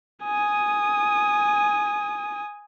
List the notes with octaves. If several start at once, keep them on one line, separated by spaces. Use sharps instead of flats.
G#5 D#6